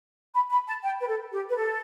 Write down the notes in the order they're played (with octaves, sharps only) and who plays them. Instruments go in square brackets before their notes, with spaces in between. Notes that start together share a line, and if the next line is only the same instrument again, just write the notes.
[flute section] B5
B5
A5
G5
B4
A4
G4
B4
A4